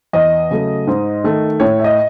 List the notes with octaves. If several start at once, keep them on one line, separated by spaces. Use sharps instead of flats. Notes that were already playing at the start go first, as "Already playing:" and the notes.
E2 D#5
C#3 F#3 A3
G#2
D#3 A3
A2 C#5
E5
D#5